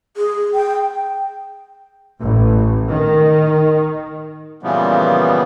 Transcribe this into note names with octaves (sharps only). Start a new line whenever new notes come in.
G#4
G5
A1
D#3
A#2 C#3 E3 F3 G3 B3